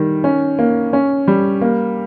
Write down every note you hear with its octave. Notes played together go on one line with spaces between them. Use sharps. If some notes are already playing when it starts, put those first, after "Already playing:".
Already playing: D#3 G3
C#4
A#3
C#4
G3
A#3